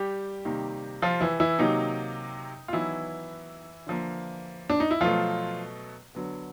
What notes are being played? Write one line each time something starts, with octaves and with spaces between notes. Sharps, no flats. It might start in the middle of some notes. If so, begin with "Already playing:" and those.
Already playing: G3 G4
C3 D#3 G3 A#3
F3 F4
E3 E4
E3 E4
C3 D#3 F#3 A#3 D#4
F4
D#3 E3 F#3 B3 E4
D3 F3 A#3
D4
D#4
E4
B2 F3 F#3 A3 F4
D3 F#3 B3